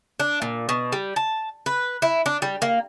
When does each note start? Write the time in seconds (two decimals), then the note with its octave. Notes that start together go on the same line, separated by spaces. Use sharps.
0.19 D4
0.42 A#2
0.69 B2
0.92 G3
1.16 A5
1.66 B4
2.02 E4
2.26 D4
2.42 G3
2.62 A#3